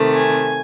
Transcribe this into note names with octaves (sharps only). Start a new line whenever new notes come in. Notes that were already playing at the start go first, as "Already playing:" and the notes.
Already playing: C3 D#3 A3
G#5